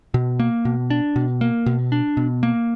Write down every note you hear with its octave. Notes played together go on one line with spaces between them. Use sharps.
B2
A#3
B2
D4
B2
A#3
B2
D4
B2
A#3